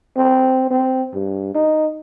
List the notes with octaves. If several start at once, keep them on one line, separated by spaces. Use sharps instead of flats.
C4
C4
G2
D#4